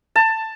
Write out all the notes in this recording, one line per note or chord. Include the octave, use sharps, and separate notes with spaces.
A5